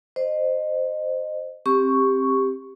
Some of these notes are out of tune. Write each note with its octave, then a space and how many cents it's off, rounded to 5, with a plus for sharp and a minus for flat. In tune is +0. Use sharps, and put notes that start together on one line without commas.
C5 -5 D#5 -20
C4 +20 G4 +10 C#6 +0